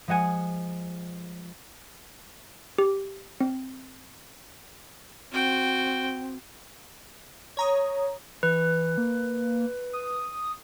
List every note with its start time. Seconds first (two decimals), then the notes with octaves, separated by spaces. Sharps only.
0.08 F3 G#3 F#5 G#5
2.78 G4
3.41 C4
5.32 C4 F#4 G5
7.57 C#5 A#5 D#6
8.43 E3 B4
8.98 A#3
9.93 D#6